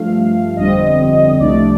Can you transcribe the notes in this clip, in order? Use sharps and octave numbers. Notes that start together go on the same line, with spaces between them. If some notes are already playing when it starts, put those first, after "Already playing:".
Already playing: G2 F3 A3 F5
G1 F2 D3 G3 C4 D#5
C2 C3 F3 A3 D4 D5